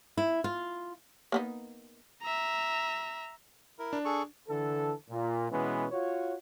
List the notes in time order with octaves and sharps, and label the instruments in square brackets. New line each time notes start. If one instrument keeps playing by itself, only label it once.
[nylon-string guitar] E4
F4
[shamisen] A#3 B3 D#4
[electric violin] E5 A#5
[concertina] E4 A#4
[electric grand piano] D4
[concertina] G#4 A4 C#6
[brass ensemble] D3 E3 A4
A#2
B2 E3 G#3 B3 C#4
F4 F#4 C#5